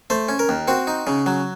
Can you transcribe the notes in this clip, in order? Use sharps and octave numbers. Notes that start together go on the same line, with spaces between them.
A3 C5
C#4
A#4
D#2
C4 F#4
D#4
C#3
F#3